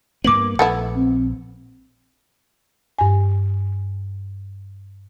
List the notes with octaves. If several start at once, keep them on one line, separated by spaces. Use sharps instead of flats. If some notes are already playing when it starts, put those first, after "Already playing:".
G2 A#3 B3 D6 F#7
A#1 A3 B3 E4 F#5
C4
G2 G#5